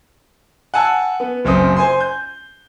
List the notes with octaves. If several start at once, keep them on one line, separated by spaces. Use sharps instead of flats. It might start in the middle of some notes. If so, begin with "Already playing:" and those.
F#5 G#5 A5 E6
B3
F#1 F#2 C4 D#6
C5 G#5 C6
G6